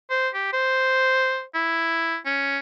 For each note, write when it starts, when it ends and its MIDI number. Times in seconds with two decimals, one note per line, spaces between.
0.10 0.29 72
0.34 0.52 67
0.53 1.43 72
1.55 2.17 64
2.26 2.59 61